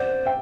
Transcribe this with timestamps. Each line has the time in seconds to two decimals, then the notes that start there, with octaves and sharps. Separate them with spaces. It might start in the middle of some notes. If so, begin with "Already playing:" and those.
Already playing: C5 D5 F#5
0.26 E5 G5